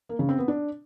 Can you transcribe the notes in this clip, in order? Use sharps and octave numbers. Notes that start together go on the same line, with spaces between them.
A#3
C#3
C4
B3
D4